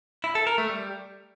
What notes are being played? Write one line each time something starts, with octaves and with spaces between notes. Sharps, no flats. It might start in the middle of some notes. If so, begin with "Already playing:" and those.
E4
A4
A#4
A3
G3